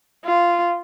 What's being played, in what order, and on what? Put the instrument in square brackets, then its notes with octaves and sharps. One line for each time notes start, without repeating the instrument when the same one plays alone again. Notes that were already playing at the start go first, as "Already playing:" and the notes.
[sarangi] F4